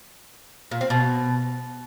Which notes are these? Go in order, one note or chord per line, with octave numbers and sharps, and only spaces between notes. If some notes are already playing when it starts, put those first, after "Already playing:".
A#2
C4
B2